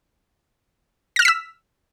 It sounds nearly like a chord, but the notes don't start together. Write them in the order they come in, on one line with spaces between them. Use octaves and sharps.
A#6 F6 E7 B6 E6